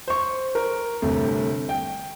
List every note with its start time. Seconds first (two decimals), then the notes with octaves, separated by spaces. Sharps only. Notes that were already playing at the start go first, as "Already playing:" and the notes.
0.08 C5 C#6
0.55 A#4
1.02 G1 C3 A3
1.69 G5